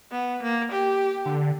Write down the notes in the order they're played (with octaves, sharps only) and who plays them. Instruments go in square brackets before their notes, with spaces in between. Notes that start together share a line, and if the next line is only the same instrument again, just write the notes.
[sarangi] B3
A#3
G4
[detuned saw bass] D3